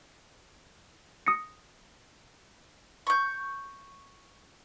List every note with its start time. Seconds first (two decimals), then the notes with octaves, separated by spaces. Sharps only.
1.27 D#6 A#6 C#7
3.07 C#6 G6